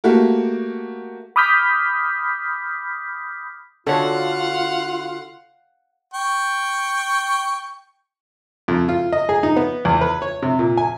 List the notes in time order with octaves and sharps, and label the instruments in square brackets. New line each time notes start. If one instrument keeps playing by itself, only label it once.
[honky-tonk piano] A3 A#3 F#4 G4
[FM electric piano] B5 D6 D#6 F6 G6 B6
[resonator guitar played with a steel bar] D3 F#4 [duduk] F4 [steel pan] A4 C#5 [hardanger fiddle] F5 F#5
[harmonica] G5 C#6
[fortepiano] F2
F4
D#5
G#4
D#4
B3
E2
B4
C#5
C3
A#2
G#5